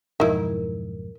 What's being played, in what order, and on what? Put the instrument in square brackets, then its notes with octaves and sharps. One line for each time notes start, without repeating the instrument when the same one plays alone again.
[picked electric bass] B1 F2 G#2 [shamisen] D#4 E4 [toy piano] A#4